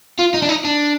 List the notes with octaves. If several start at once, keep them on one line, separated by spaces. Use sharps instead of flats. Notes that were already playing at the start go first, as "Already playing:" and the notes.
F4
D#4
D4
D#4
D4